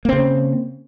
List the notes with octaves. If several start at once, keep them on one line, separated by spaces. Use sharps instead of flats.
C#3 A#3 C4